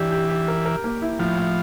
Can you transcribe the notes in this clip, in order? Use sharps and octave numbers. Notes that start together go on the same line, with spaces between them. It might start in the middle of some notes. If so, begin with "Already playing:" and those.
Already playing: E3 D4 G4
G4
G4
A#4
A#4
A#3
E4
A2 F3
A2